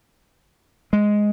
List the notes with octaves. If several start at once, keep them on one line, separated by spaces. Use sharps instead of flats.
G#3